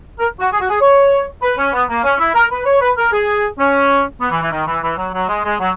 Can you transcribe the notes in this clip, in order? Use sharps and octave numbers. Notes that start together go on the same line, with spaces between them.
A#4
F#4
G#4
F#4
G#4
C#5
B4
C#4
B3
A#3
C#4
E4
A#4
B4
C#5
B4
A#4
G#4
C#4
B3
E3
E3
D#3
E3
E3
F#3
F#3
G#3
G#3
F#3